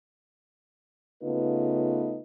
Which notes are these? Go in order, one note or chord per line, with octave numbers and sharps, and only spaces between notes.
C#3 A3 B3 D#4 F4 B4